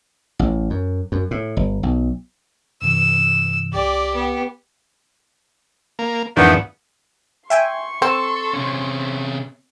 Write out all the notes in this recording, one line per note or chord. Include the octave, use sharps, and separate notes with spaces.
A1
F#2
F#2
A2
G1
B1
G2 C3 E3 E6
C2 G4 D5
B3
A#3
F2 G#2 D#3 E3 B3 D4
E5 G5 G#5 C6 C#6
C4 A4 E6
C3 C#4